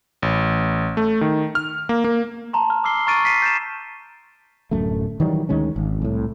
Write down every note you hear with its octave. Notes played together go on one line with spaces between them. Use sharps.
A1
A3
D#3
F6
A#3
A#3
A5 A#5 C6
F6
D6 E6 F6 C7 G7
A#5 C#6 F6 A6 D7 D#7
A6 B6 C7 D#7
G6 A6 B6 D#7 E7
D1 F#2 A3
D#3 E3 F#3 G3
D2 D#3 G#3 C#4
G#1
C2 A2